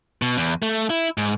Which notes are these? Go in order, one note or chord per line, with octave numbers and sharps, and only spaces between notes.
B2
E2
A3
E4
G#2